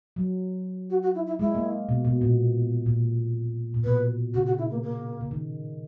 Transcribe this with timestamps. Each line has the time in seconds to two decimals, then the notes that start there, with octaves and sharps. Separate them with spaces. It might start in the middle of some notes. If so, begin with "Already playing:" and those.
0.16 F#3
0.90 F#4
1.02 F#4
1.15 E4
1.27 E4
1.39 G#3 E4
1.55 A#3
1.89 B2
2.05 B2
2.21 A#2
2.86 A#2
3.74 A#2
3.84 B2 B4
4.34 C#3 F#4
4.46 F#4
4.58 E4
4.71 A#3
4.83 A#3
5.21 C#3
5.31 D#3